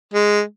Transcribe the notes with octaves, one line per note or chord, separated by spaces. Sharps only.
G#3